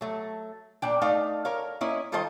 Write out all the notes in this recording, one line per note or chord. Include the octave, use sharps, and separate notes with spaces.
F#3 A3
A#2 D4 G5
A3 D#4 D5 F5
A#4 C#5 F5
A#3 C#4 E4 C#5 D#5
D#3 G3 F4 A4 C5 D#5